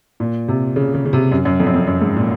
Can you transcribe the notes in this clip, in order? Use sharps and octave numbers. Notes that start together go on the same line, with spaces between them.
A#2
C3
C#3
C#3
C#3
C3
F#2
F#2
F2
F#2
F2
F#2
G#2
A#2